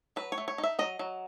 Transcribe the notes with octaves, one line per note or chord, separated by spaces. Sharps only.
F#3 B4
C#5
A3
C#5
D#4
E5
F#3 D#5
F#3